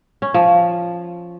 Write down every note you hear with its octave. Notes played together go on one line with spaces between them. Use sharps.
C#4
F3